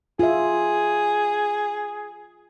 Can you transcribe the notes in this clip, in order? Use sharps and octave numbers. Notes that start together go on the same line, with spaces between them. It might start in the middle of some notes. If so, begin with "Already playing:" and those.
F4 G#4 E5